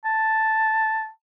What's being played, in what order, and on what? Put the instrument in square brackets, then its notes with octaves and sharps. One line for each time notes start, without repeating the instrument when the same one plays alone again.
[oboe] A5